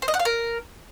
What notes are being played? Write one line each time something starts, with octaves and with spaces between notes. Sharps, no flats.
C5
D#5
F#5
F5
A#4